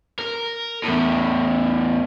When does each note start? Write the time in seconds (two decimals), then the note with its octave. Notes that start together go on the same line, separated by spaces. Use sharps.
0.19 A#4
0.83 E2 A2